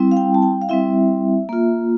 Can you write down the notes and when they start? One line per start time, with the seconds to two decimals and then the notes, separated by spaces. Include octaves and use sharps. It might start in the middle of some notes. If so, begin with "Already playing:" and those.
Already playing: G3 C4 E4
0.11 F5
0.17 G5
0.34 A5
0.42 G5
0.62 F5
0.69 G3 C4 E4 E5
1.49 A#3 F4